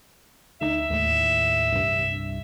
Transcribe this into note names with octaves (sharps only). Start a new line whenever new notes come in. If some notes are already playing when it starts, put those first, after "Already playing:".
D2 D#4 E5
D#2 A2
C2 G2